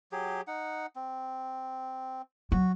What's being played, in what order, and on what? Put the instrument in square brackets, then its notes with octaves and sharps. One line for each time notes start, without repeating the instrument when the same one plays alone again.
[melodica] F#3 G4 G#4
D#4 F#5
C4
[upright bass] F#3 [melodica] F#4